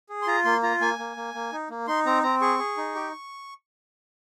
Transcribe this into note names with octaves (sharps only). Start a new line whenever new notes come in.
G#4
C6
F4 A#5
A#3 C6
F4 A#5
A#3 G#5
A#3
A#3
A#3
D#4
A#3
D#4 C6
C4 A#5
C4 A#5
G#4 C#6
G#4
D#4
G4